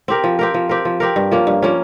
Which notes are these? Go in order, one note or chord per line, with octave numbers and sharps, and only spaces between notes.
C4 G4 A#4
F3
C4 G4 A#4
F3
C4 G4 A#4
F3
C4 G4 A#4
G2
F3 A#3 C#4
G2
F3 A#3 C#4